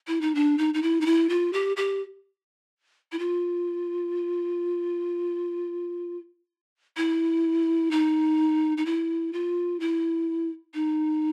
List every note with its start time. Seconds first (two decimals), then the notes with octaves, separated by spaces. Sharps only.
0.08 E4
0.21 D#4
0.35 D4
0.58 D#4
0.74 D#4
0.82 E4
1.01 D#4
1.06 E4
1.29 F4
1.53 G4
1.77 G4
3.12 E4
3.19 F4
6.97 E4
7.91 D#4
8.77 D#4
8.86 E4
9.33 F4
9.80 E4
10.74 D#4